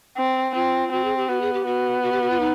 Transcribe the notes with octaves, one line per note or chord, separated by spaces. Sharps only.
C4
C4 F4
C4 F#4
G#4
G4
B3 F#4
G#4
G4
B3 F#4
F#4
G4
F#4
F4
D#4